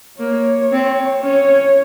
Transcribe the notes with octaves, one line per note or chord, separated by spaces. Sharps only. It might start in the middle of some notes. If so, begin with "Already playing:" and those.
A#3 C#5
C4
C#4 C#5